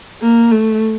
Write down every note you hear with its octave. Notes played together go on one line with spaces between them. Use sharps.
A#3
A3